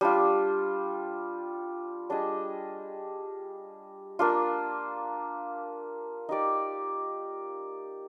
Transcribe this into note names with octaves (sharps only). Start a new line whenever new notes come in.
G3 D4 F4
G3 D4 G#4 D#5
A#3 D4 F4
D#4 G4 D5